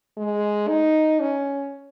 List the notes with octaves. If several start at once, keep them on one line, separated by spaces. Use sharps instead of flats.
G#3
D#4
C#4